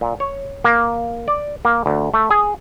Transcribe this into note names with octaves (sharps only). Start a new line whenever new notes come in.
A#2
C#5
A#3
D5
A#3
D2
A3
G#4